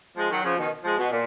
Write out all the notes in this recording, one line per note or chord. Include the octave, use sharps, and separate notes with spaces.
F3 G#3
D#3 F#3
C#3 F3
B2 D#3
F3 G#3
B2
A#2